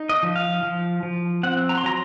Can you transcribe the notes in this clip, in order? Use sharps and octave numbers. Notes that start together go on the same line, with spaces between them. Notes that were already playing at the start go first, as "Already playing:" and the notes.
Already playing: D#4
D#5
F3
F5
F3
F3
C4 F#5
A#5
C6
F#3 A#5